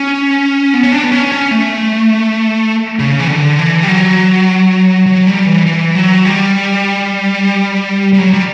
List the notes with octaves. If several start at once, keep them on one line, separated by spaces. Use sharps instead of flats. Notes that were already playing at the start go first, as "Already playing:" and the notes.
Already playing: C#4
B3
C#4
D4
B3
C#4
C#4
A3
C#3
E3
D3
E3
G3
F#3
F#3
G3
E3
E3
F#3
G3
G3
F#3
G3